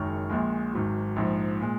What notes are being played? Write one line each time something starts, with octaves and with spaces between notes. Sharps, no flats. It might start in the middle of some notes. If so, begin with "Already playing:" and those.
Already playing: F#1 F#2 D#3 G#3 C#6 F6
A#1 A#2 G#3
G#1 G#2 F#3
A#1 G#2 F3
A#2 G#3